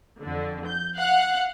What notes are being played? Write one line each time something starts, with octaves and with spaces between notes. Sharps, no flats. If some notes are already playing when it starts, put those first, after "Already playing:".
F2 D3
G6
F5 F#5 F#6